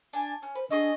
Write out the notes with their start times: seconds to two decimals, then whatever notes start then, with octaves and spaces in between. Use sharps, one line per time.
0.13 D4 G#5
0.42 C#4 F6
0.55 B4 C5
0.71 D4 G#4 D#5 C#6 E6